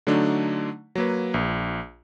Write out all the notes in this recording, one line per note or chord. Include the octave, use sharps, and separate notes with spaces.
D3 F#3 A3 D4 D#4
F#3 A#3 B4
A#1